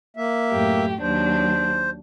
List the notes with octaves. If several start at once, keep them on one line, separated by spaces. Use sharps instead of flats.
A#3 E5
F#2 A2 G4
D#2 F#3 D4 C5